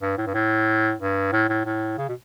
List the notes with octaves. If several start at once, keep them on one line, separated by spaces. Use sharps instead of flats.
G2
A2
G2
A2
G2
A2
A2
A2
C#3
B2